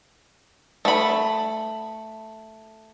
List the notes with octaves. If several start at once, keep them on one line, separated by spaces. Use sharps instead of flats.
A3 B5